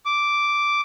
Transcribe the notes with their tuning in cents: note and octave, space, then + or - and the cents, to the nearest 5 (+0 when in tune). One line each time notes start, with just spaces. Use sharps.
D6 -5